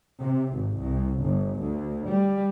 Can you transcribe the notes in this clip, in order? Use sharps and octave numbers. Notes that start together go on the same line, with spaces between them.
C3
G#1
C2
G1
D2
G3